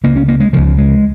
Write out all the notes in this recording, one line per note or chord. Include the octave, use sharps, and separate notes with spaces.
C#2 C#3 A#3
C#4
A#3
G#3
C#2 C#3 F3
G#3